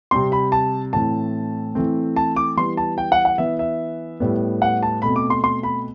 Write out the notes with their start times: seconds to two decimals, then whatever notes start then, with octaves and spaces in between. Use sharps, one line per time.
0.11 C3 G3 C4 C6
0.32 B5
0.52 A5
0.93 A2 E3 A3 C4 A5
1.75 E3 A3 C4
2.16 A5
2.36 D6
2.57 E3 G3 B3 C6
2.77 A5
2.98 G5
3.12 F#5
3.25 F#5
3.38 E3 B3 E5
3.59 E5
4.20 A2 G3 B3
4.62 F#5
4.83 A5
5.02 B2 A3 C4 B5
5.16 D6
5.30 C6
5.44 C6
5.63 B5